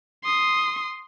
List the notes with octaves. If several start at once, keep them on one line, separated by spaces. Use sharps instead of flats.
C6 D#6